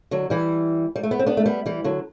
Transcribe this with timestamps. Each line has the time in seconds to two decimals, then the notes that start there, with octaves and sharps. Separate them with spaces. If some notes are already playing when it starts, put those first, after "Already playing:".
0.11 D3 F#3
0.30 E3 G3
0.96 G3
1.03 A3
1.11 B3
1.19 C4
1.26 B3 D4
1.37 A3
1.46 G3 B3
1.66 E3 G3
1.84 D3 F#3